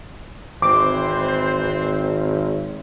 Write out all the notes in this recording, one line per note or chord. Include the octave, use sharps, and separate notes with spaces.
G#1 E3 C4 C5 D6